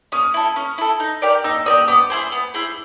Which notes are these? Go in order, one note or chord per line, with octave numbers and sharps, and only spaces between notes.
C#4 D#6
E4 A4
C#4
E4 A4
D#4
G4 A#4 D5
D#4 E6
G4 A#4 D5 D#6
B3 D6
E4 G#4 C5
B3
E4 G#4 C5